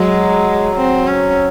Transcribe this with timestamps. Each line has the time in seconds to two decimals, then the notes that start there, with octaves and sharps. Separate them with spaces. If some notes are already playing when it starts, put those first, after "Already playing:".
Already playing: F#3 G#3
0.76 C4
1.07 C#4